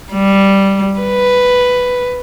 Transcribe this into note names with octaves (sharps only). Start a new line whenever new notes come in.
G3
B4